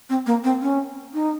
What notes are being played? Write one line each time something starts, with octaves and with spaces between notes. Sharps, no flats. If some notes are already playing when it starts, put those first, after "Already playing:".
C4
A#3
C4
C#4
D#4